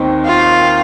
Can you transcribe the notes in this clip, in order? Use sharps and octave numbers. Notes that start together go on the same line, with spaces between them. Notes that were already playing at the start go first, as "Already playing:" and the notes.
Already playing: D#2 D#3 C4 D#4
F4